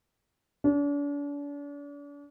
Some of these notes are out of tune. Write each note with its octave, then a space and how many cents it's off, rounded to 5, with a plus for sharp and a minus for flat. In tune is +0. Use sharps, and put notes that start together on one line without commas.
D4 -40